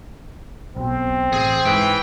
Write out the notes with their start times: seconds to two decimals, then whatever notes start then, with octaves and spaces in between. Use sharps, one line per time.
0.76 B1 B2 C4
1.33 A1 G#4
1.65 G#2 E3 G5